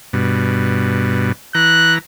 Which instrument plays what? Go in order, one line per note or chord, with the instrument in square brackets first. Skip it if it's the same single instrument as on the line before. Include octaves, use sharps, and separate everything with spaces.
[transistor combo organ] G2 B2
[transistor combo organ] E3 A#5 [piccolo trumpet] F#6